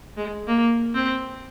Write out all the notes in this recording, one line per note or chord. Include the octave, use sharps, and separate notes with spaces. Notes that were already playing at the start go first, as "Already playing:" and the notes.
G#3
A#3
C4